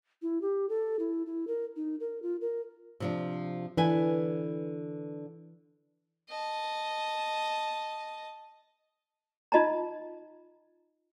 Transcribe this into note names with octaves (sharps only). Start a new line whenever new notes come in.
E4
G4
A4
E4
E4
A#4
D#4
A#4
F4
A#4
C3 F3 D4
D3 E3 B4 G#5
D#5 A5
D#4 F4 D#5 A5 A#5